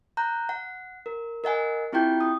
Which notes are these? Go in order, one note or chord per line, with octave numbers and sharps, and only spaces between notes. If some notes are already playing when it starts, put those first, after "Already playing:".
A#5 F#6 G6
F#5
A#4
A#4 D#5 F#5 G#5
C4 E4 F4 G4 G5 G6
D#6